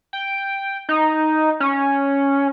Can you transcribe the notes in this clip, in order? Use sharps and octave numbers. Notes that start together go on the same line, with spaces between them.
G5
D#4
C#4